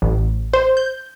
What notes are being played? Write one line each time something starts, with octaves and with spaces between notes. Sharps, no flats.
A1
C5
G6